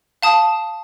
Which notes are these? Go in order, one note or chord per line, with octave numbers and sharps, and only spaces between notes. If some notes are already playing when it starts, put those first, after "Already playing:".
F5 A5 D#6